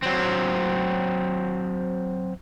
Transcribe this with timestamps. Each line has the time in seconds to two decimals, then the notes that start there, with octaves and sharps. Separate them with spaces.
0.03 F#3 C4